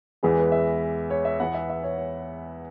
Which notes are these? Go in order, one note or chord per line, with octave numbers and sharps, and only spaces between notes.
E2 E3 G#3 B3 G#4
B4
E5
C#5
E5
E2 E3 B3 F#5
E5
E5
C#5
C#5